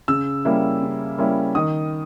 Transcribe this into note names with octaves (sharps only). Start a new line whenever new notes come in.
C#3 E6
G3 A#3 C#4 E4
C#3
G3 A#3 C#4 E4
D#3 D#6